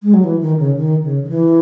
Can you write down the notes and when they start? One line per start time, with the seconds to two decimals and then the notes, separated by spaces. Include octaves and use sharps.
0.03 G#3
0.14 F#3
0.24 E3
0.41 D#3
0.59 C#3
0.77 D#3
1.03 C#3
1.24 D#3
1.29 E3